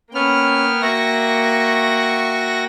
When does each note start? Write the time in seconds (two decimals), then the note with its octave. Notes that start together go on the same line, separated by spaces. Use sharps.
0.14 A#3 B3 C#4 G5 F6
0.82 F#4 E5 C#6 A#6